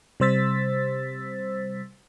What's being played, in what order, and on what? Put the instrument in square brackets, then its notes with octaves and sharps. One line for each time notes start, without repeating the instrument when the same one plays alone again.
[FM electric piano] C3 G3 C5 E6 A6 B6